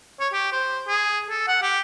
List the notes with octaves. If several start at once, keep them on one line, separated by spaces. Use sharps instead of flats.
C#5
G4
C5
G#4
A4
F#5
G4